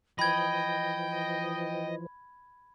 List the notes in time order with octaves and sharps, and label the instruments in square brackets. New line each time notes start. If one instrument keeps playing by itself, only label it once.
[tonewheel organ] E3 F3 [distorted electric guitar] D#5 [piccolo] G5 [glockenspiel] B5 G#6